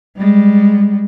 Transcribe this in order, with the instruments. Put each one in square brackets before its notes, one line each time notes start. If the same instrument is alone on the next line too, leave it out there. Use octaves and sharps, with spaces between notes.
[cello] G3 G#3